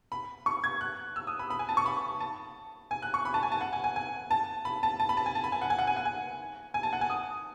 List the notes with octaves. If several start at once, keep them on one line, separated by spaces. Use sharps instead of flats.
B5
C#6
G#6
F#6
E6
D#6
B5
B5
G#5
A5
C#6
B5
A5
G#5
F#6
C#6
B5
A5
G#5
A5
F#5
G#5
G#5
G#5
A5
B5
A5
A5
B5
A5
G#5
A5
B5
G#5
F#5
G#5
F#5
G#5
F#5
G#5
G#5
A5
F#5
G#5
D#6